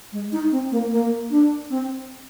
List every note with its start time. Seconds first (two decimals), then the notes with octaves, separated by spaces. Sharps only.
0.12 G#3
0.32 D#4
0.51 C4
0.71 A#3
0.91 A#3
1.30 D4
1.70 C4